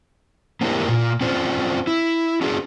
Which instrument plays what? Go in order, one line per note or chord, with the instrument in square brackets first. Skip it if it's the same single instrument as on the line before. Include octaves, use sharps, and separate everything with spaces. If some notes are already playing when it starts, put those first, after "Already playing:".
[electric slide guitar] A#3 C4 D4 E4 G4 A#4
A#2 F4
C4 C#4 F4 C5 D5
E4
C#4 D4 F#4 G#4